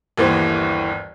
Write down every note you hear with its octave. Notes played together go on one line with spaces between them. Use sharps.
G1 D#2 E3 B3 C5